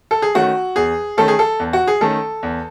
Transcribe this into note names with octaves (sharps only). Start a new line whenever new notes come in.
A4
G#4
D#3 A3 C#4 F#4
E2 G#4
D#3 A3 C#4 A4
G#4
A4
E2
F#4
G#4
D#3 A3 C#4 A4
E2